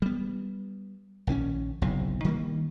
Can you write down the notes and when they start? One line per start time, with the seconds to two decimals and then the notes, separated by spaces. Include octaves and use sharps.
0.02 G3 B3
1.27 A#1 D#3 C4 C#4
1.82 F#1 B1 A2 C3
2.25 D#3 G3 A#3